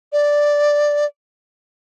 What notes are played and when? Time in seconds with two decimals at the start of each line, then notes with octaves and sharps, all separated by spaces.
0.13 D5